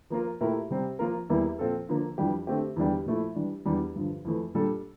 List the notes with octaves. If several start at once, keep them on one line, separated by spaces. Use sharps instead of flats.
F3 A#3 F4 A#4
A#2 A3 E4 G4 A#4
C3 G3 C4
F3 A#3 F4 A#4
E2 E3 G3 A#3 E4
A#2 F3 C4 F4 A4
D3 F3 A#3
F2 E3 G3 D4 G4
D3 A3 C4 G4
E2 D3 G3 D4 G4
A#2 F3 A3 E4
E3 G3 D4
E2 E3 G3 D4
G2 D3 F3
F2 E3 A3
A#2 G3 D4 A4